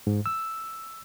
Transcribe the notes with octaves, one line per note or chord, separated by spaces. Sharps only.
G#2
E6